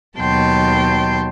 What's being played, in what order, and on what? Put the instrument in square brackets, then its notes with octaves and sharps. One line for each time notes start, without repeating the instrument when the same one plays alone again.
[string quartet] D#2 B2 F#3 G5 A5 C6